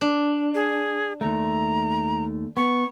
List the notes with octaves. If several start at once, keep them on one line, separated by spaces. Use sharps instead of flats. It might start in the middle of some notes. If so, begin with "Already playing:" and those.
D4
G#4
D#2 A3 A#5
B3 C#6